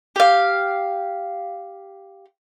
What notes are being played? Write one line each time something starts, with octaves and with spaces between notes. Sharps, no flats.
G4 F5